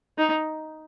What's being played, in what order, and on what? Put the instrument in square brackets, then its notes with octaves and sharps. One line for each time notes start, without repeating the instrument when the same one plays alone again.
[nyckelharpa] D#4